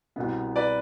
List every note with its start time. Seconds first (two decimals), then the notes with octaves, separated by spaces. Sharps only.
0.16 C2 B2 B3
0.56 B4 D5